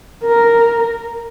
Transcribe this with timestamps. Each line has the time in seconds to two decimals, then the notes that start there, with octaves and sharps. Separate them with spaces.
0.24 A#4